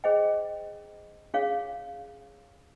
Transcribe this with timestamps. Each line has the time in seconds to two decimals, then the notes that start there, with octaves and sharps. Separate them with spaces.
0.04 G#4 C5 D#5 G5
1.34 C#4 G#4 C#5 F5